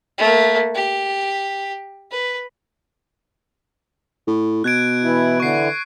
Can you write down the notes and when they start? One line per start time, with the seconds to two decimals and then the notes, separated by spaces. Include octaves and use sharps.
0.18 A3 A#3
0.75 G4
2.11 B4
4.27 A2
4.64 B2 F#6 G#6 D7
5.04 E3 E4
5.40 D3 E3 C#6 C7